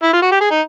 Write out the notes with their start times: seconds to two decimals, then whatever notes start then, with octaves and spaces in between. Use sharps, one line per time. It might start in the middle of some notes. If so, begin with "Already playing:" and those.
0.03 E4
0.13 F4
0.22 F#4
0.32 G4
0.41 G#4
0.51 D#4